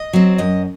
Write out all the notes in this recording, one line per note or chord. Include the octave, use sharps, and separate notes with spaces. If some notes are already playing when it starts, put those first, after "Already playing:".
Already playing: D#5
F#3 C4
F#2 D#5